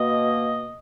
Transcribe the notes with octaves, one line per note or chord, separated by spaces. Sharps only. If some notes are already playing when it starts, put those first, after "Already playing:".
Already playing: B2 A#3 D#5